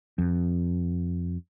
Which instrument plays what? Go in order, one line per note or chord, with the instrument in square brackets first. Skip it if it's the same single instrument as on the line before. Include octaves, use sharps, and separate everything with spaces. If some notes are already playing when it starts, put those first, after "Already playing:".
[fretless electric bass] F2